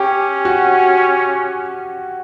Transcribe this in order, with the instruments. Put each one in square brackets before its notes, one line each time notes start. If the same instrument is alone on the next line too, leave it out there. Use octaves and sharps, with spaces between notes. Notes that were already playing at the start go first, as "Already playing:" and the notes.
Already playing: [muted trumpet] C#4 [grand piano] G4
[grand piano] F#4